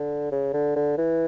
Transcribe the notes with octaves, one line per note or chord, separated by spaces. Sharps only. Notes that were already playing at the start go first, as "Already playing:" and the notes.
Already playing: D3
C#3
D3
D3
E3